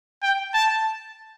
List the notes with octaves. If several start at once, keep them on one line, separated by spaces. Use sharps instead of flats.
G5
A5